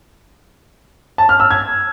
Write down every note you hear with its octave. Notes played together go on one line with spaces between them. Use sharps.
A5
F6
E6
G#6